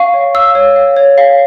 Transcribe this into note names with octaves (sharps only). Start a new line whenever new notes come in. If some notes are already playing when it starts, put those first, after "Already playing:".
Already playing: F5 C#6
C#5
F5 E6
C#5
F5
C#5
F5